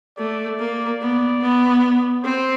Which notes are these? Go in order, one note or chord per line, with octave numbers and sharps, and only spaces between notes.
A3 D5
A#3
B3
B3
C4 C5